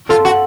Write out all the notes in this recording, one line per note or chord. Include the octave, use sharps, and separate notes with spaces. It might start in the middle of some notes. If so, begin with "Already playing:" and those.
F4 A4
F#4